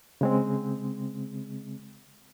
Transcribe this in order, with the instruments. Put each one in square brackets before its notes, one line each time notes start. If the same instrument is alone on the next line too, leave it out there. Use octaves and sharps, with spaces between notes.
[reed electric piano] C#3 G#3 C4